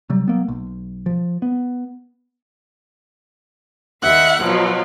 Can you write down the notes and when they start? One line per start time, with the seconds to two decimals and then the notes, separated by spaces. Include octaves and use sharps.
0.10 C3 F#3 G3
0.28 F#3 A#3 B3
0.48 B1
1.06 F3
1.42 B3
4.02 D#2 E5 F#5 F#6
4.43 B2 F3 F#3